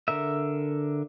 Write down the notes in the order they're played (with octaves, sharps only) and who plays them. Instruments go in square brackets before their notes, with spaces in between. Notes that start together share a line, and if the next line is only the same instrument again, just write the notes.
[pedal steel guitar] D3 A#4 E5